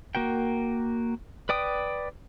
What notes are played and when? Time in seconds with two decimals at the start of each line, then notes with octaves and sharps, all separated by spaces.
0.15 A#3 F#4 A#4 G5
1.49 B4 D5 G5 D#6